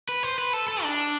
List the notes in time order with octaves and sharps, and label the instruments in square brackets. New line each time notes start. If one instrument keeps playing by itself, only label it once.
[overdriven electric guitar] B4
C5
B4
A4
A4
D4